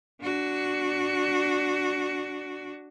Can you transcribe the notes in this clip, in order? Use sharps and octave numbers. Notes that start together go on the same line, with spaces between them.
D4 F#4